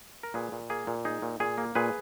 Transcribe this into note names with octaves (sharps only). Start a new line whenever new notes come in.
A#4
A#2 G#4 B4
A#2
A#3 G#4
A#2
D#4 G#4
A#2
A#2 G#4
A#3
A#2 G#4 B4